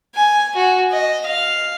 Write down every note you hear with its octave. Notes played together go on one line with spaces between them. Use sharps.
G#5
F#4
D#5
F5